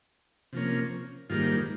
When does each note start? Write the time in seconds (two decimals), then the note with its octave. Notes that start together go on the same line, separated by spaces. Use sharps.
0.53 C3 F3 A#3 C#4
1.29 G#2 D#3 G3 A#3 F4